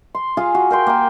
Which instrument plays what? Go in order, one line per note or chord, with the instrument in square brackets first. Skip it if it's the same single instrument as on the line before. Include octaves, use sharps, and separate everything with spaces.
[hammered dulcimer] C6
F4 G#4 F5
F#4
A#4 G5 C6
A#3 G5